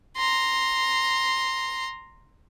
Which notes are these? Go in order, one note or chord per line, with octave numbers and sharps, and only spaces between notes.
A#5 C6